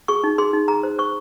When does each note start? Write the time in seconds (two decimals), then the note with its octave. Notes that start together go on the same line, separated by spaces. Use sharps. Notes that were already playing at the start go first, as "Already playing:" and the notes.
0.08 G#4 C#6
0.24 D#4
0.38 G#4 C6
0.53 D#4
0.68 G#4 A#5
0.83 C5
0.99 C5 C#6